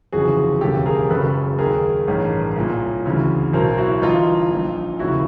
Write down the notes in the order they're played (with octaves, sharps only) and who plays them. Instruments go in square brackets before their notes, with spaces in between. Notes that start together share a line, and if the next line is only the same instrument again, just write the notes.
[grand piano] G1 F2 C#3 E3 F#4 G#4
E1 D#2 C#3 G4 A4
G#4 A#4
F#1 F#2 C#3 A4 B4
D#2 D#3 G#4 A#4
A1 G2 D#3
C2 A#2
D2 C#3 E3
B1 B2 A#4 C5
E4 F#4
G1 G2 E3 D#4 F4
A#1 A#2
F1 D#2 C#3 E4 F#4